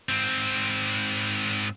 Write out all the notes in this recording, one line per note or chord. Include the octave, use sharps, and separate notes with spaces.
G#2 C4